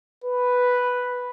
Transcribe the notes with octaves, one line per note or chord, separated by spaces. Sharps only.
B4